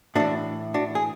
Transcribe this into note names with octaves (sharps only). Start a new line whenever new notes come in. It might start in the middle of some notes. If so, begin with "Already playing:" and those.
A2 E3 D4 F#4
D4 F#4
G#4